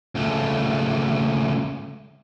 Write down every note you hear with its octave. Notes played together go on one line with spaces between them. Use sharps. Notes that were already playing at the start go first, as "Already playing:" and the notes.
C#2 A3